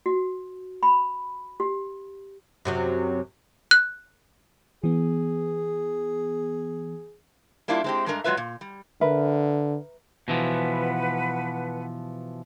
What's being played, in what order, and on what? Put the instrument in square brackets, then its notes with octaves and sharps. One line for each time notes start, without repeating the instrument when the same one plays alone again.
[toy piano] F#4
B5
G4
[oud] F#2 C3 F#3
[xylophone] F#6
[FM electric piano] E3 B3 [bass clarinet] G#4
[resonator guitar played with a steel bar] G3 A#3 D4 E4 F4
G#3 C4 G4
G2 G#3 A3 D4 A#4 A#5
F#3 G#3 F4 B4 E5
A#2
G3
[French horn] D3 [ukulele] A#4 B4 E5
[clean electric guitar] B2 E3 F3 [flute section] B4 F#5